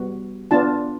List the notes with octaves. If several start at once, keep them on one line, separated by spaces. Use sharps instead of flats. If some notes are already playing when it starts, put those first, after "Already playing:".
Already playing: G3 B3 F#4
B3 D4 F4 A5